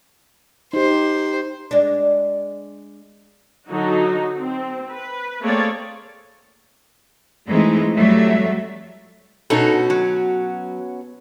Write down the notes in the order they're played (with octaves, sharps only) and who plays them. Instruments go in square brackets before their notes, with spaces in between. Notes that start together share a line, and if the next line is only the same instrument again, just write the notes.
[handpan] D#4 G4 [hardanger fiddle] C5
[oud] G#3 D4
[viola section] D3 F#3 D#4 F#4
C4
B4
A3 A#3 C4 G#4 C#5 D5
[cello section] E3 G#3 A3 C4 D#4
F2 F#3 G3 A3 E5
[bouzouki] B2 C#4 F#4 [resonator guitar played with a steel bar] D#4 A4
[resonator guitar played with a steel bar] F#3